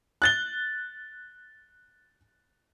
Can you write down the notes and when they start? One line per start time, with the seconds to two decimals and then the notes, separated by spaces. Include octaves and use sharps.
0.22 F#6 A6 G7